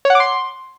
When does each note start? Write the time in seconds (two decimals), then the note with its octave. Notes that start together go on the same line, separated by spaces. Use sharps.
0.05 C#5
0.10 F#5
0.15 D6
0.20 C6